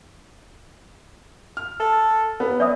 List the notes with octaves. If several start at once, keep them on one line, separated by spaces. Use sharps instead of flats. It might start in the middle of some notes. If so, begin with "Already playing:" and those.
F6
A4
D#2 B3
C#4 D5 E5 D#6